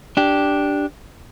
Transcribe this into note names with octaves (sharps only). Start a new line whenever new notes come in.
D4 G4